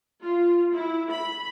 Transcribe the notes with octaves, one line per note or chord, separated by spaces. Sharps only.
F4
E4
B5